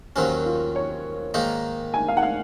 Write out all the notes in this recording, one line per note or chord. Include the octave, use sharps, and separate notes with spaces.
D#2 D#3 F#3 C#4 C5
F4
C#5
G#2 D#3 A#3 D#4
G#5
F5
F#5
F5